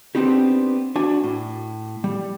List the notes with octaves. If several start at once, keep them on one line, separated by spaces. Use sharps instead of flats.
B3 C4 D4 D#4 G4
D4 F#4 G#5
A2
G3